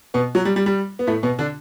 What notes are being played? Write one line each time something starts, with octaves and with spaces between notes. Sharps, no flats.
B2 B3
F#3
G3
G3
G3
B3
A2 A3
B2 B3
D3 D4